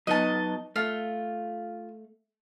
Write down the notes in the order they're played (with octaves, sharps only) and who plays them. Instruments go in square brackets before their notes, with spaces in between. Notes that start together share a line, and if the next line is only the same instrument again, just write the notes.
[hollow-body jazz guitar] F#3 B3 D#4 [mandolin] D#5 A5
[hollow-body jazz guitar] A3 [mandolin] F4